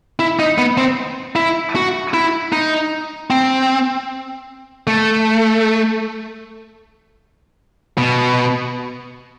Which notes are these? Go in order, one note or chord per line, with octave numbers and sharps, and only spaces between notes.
E4
D#4
B3
C4
E4
F#4
E4
D#4
C4
A3
B2